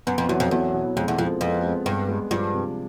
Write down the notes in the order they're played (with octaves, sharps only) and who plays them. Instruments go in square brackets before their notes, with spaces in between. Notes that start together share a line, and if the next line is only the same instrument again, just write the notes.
[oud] F#2 [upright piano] B3
[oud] F2
[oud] E2 [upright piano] F#3
[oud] F2
[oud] E2 [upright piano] F#3
[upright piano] B2
[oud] F2 [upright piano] G#3
[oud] E2
[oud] F2 [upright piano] F3
[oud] F2 [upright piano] B3
[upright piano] G#3
[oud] G2 [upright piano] B3
[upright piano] G#3
[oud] G2 [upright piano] F3
[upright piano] C3